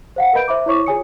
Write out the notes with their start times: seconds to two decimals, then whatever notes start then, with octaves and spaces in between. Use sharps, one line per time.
0.16 C5 F5 F#5
0.33 A#4 B4 D#5 B5 G6 D7
0.48 C5 E5 B5 D6
0.66 E4 C5 C#5 C#6 D6
0.86 F4 G#4 C#5 G#5 D#6 C#7